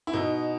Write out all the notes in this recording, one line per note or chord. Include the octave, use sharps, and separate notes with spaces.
E4
B2 D#4